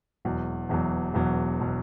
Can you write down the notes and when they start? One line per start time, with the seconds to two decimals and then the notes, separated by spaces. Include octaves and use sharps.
0.25 E1 E2 B2 F#3
0.69 E1 E2 B2 F#3
1.14 E1 E2 B2 F#3
1.61 B2 F#3